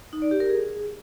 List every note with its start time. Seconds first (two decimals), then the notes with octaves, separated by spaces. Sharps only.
0.13 D#4
0.22 D5
0.31 G4
0.40 A#4
0.50 G#4